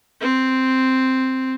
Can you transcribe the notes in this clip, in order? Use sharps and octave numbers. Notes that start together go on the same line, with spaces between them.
C4